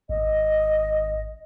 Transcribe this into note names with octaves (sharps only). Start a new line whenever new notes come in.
G#1 D#5